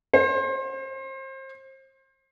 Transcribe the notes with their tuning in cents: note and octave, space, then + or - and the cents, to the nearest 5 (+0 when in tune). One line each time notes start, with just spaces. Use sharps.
C5 +30